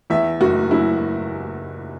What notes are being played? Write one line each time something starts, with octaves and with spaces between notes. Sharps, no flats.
E2 E5
F#1 F#4
F#3 E4